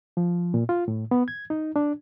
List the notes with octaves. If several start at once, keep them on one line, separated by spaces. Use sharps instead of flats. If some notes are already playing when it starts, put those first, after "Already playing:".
F3
A#2
F4
A2
B3
G#6
D#4
D4